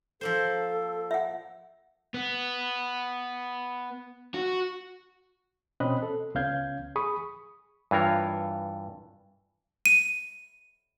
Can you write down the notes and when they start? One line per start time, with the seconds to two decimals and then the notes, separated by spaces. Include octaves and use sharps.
0.21 F3 A#3 A4 C5
1.11 E5 F#5
2.14 B3
4.34 F#4
5.80 B2 C4 C#4 D#5 B5 F#6
6.02 A4
6.35 C#2 B3 C#4 F5 G6 G#6
6.96 G#4 B5 C#6 D#6
7.91 G2 E3 F4 A#4 C#5
9.86 D#7